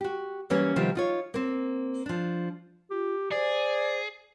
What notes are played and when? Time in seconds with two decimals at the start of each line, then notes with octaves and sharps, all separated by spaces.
0.01 F#4 G4
0.50 E3 F#3 G3 A#3 C#4 C#5
0.76 C3 D#3 F3 G3 B3
0.95 D#4 F4 C#5
1.34 A#3 C4
2.06 F3 D4
2.90 F4 G4
3.31 G#4 C5 D5